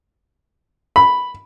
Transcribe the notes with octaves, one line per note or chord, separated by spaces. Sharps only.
B5